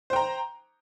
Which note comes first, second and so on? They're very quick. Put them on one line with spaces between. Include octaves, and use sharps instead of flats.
C5 G5 A#5